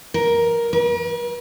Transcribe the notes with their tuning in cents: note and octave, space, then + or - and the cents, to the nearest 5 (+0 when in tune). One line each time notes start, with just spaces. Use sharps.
A#4 +10
A#4 +45